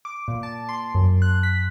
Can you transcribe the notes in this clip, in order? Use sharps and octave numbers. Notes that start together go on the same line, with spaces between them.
D6
A#2
A5
C6
F#2
F#6
B6